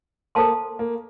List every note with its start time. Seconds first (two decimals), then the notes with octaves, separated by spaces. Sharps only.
0.35 A#3 A4 C5 F5 A5 C6
0.79 A#3